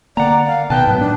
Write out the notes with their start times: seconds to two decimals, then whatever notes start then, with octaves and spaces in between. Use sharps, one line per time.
0.17 D3 A#3 D5 F#5 A#5
0.46 F5
0.70 B2 D#3 D#4 B4 G5 A5
0.87 G#2 F#3 B3
0.99 A#2 D4